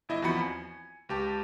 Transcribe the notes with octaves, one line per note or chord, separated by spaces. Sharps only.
G1 E4 D#5
E2 F3 C4 F#4 B5 C#7
G#5
C#2 G4 A5